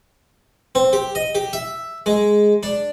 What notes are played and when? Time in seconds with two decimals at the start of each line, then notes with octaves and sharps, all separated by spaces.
0.75 C4
0.93 G4
1.15 D#5
1.35 G4
1.53 E5
2.06 G#3
2.63 D4